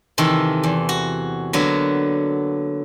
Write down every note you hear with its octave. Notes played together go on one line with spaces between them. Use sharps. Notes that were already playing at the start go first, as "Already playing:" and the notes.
C3 D#3 E3 A4
E2
F#4
D3 F#3 A#3 B3